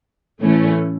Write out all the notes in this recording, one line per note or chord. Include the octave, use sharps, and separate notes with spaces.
A2 E3 A3 C#4